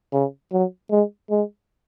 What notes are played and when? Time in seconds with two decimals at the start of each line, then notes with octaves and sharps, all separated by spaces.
0.13 C#3
0.52 F#3
0.91 G#3
1.30 G#3